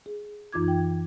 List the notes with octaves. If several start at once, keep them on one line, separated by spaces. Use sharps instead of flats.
G#4
F#2 E3 D#4 F4 D6 G#6
G5